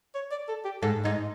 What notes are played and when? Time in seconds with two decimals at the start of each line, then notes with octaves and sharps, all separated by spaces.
0.15 C#5
0.31 D5
0.48 A4
0.65 G4
0.82 G#2 A4
1.04 G#2 D#4